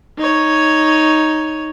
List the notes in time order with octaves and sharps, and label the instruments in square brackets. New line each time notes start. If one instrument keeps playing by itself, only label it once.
[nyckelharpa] D#4 C#5